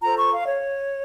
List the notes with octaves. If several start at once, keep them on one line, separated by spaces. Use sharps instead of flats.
F4 A4 C5 A#5
C#6
F5
C#5